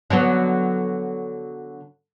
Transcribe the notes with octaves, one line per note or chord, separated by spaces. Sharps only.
D3 F#3 B3